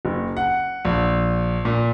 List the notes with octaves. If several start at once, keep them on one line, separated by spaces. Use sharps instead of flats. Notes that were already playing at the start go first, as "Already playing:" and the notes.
F#1
F#5
A#1
A#2